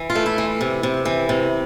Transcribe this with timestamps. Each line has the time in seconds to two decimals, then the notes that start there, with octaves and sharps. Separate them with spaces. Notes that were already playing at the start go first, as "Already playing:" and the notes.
Already playing: E3
0.10 F4
0.15 A3
0.26 E4
0.38 E3
0.61 C3
0.83 C3
1.05 E3
1.29 C3